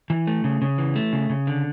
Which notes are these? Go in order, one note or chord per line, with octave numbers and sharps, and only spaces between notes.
E3
A3
C#3
C#3
E3
A3
C#3
C#3
D3